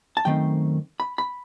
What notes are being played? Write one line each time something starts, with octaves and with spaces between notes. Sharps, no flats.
A5
F#2 D#3 A3 C4 G5
B5
B5